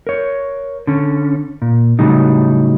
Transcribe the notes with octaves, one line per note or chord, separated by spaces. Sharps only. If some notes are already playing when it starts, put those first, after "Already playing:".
A#4 C#5
D3 C#4
A#2
A2 C#3 F#3 G3 D#4